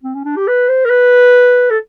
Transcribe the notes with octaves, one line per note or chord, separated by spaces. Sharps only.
C4
C#4
D4
G4
B4
C5
A#4
B4
A4